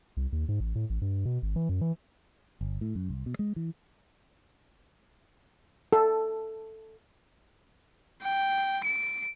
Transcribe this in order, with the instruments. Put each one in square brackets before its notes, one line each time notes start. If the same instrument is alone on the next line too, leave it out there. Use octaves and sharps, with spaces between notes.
[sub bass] C2
D#2
G#2
A1
A2
A1
G2
B2
G#1
E3
F#2
E3
[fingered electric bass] G1
A2
F#2
C2
B2
G#3
E3
[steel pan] A4
[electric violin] G5
D7